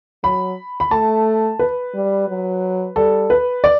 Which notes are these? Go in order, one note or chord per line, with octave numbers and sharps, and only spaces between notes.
F#3 B5
B5
A3 A5
B4
G3
F#3
G3 A4
B4
D5